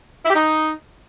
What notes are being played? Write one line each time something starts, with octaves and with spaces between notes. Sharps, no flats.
E4
G4
D#4